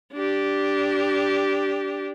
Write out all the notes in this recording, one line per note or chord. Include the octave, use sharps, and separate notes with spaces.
D4 G4